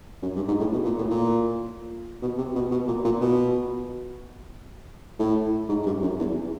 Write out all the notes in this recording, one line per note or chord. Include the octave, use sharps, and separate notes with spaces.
F#2
G2
G#2
A2
B2
A#2
A2
A#2
B2
C3
B2
B2
A#2
A#2
B2
A2
G#2
G#2
G2
F#2
E2